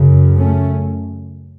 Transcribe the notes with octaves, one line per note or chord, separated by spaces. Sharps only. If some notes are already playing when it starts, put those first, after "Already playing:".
Already playing: F#2 C#3
A3 C#4